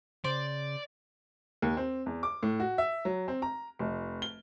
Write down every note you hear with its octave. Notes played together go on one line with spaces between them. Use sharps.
C#3 C5 D5
D#2
C4
E2
D6
A2
F#4
E5
F#3
C4
A#5
F1
G7